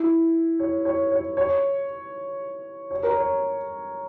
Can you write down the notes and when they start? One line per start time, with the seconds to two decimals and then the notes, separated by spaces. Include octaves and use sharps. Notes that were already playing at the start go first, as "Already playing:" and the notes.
Already playing: E4
0.60 C#5
0.85 C#5
1.12 C#5
1.37 C#5
2.91 C#5
3.03 A#4
3.17 C#5